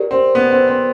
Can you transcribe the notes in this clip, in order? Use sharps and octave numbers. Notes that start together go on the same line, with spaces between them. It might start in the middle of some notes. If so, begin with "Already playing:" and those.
Already playing: G4 A#4 D5
C4
B3
C4
C4